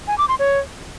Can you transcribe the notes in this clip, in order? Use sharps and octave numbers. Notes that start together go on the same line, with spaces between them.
G#5
D6
C6
C#5